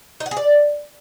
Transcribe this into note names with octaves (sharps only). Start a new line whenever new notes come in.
D#4
F#5
G#4
D5